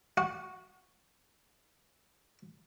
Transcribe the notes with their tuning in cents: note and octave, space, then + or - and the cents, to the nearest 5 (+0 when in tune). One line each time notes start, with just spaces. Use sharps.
F#4 +0 F#5 -45